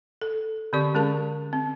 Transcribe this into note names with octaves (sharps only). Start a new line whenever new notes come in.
A4
D3 C4 G4 D5 C#6
D3 G#3 C#4 G#4 A#4 A5
C4